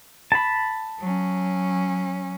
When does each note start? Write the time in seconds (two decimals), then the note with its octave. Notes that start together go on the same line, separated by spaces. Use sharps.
0.32 A5 B5
0.99 F#3 C#4